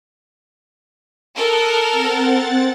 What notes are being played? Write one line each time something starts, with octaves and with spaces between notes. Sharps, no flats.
A4 A#4 D#6 F#6
C4 F#5 A6